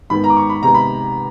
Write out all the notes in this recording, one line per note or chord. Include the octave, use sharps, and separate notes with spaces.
G#2 D#3 G#3 B3 B5
A#5
D6
C#6
B5
C3 D#3 G#3 B3 A#5
B5